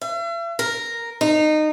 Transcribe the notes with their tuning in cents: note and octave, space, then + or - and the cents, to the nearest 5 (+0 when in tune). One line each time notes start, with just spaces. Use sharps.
E5 +45
A#4 +0
D#4 -20